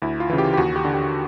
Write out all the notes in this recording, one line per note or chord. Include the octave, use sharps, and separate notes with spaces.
D2 E4
F4
C#3 E3
G4
G4
D#2 F#4
G4
D3
G4